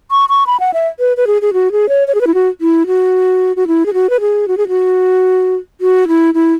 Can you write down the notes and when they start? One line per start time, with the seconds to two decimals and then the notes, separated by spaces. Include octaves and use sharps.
0.11 C#6
0.29 C#6
0.47 B5
0.60 F#5
0.74 E5
1.00 B4
1.17 B4
1.27 G#4
1.42 G#4
1.53 F#4
1.72 G#4
1.89 C#5
2.08 C#5
2.15 G#4
2.21 B4
2.27 E4
2.34 F#4
2.61 E4
2.87 F#4
3.56 F#4
3.67 E4
3.86 G#4
3.94 F#4
4.10 B4
4.21 G#4
4.48 F#4
4.57 G#4
4.68 F#4
5.81 F#4
6.08 E4
6.34 E4